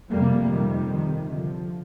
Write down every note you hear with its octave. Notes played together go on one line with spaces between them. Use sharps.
F2 C3 G3 A#3
D#3 G3
D#3
D3 F3